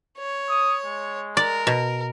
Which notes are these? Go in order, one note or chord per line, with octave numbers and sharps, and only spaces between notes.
C#5
D#6
G#3
A#4 D5
B2